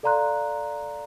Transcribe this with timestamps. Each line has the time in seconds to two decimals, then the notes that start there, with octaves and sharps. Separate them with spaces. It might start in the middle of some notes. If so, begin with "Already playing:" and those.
0.03 A4 D5 F5 A#5 C6 F#6